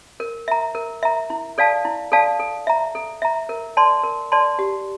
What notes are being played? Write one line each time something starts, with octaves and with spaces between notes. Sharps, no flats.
A#4
E5 A#5
A#4
E5 A#5
E4
A4 D5 F5 A5
E4
A4 D5 F5 A5
A4
E5 A#5
A4
E5 A#5
A#4
D5 A5 C6
A#4
D5 A5 C6
G4